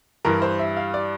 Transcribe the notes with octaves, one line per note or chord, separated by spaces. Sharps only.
G2 E3 A#4
C5
E5
F5
D5